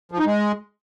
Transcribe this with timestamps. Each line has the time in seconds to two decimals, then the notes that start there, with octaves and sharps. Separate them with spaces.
0.12 F3
0.19 D#4
0.26 G#3